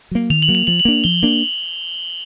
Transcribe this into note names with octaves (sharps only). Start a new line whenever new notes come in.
F#3 A#3
D#3 F7
F#7
F#3 A#3
F7
F3 F#7
F#7
A#3 D4
F3 G7
A#3 D4